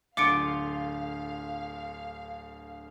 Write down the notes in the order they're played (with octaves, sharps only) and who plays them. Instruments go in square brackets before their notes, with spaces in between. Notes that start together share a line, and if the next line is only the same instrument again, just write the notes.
[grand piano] D1 D3 [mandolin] F4 [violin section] F5 [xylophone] D6 C#7 D7